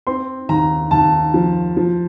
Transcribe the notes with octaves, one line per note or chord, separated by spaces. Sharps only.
C4 C6
D#2 A#5
D#2 A5
F3
F3